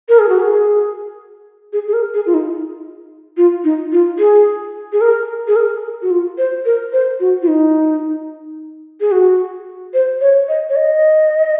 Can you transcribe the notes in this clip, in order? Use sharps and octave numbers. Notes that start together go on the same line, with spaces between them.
A#4
G#4
F#4
G#4
G#4
G#4
A#4
G#4
F4
D#4
F4
D#4
F4
G#4
G#4
A#4
G#4
A#4
F#4
F4
C5
A#4
C5
F#4
F4
D#4
G#4
F#4
C5
C#5
D#5
C#5
D#5